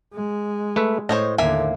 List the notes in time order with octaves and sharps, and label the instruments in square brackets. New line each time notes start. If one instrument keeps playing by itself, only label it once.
[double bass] G#3
[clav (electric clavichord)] A3 B4 E5
[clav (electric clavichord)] A2 [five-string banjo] C5 C#5 D#5
[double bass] D#2 D3 [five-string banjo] A#3 E5 G#5